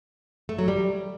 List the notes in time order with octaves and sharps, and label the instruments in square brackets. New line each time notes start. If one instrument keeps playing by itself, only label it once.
[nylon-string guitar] A3
F#3
G3